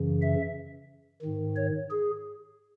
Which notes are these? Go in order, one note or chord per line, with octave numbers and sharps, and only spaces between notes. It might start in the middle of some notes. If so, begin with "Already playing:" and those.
Already playing: F#2 C#3 E3
E5
G#2 D#3
C#5
G#4